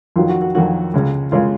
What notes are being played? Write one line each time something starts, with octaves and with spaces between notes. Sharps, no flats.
F2 D#3 F#3 F4
F#4
F#4
F2 D#3 F#3 F#4
C#2 C#3 G#3
C#3 G#3 F4